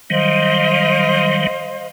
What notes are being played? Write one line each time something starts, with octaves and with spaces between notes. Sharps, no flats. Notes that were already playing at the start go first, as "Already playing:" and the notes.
D#3 F#3 G3 C5 D#5 F5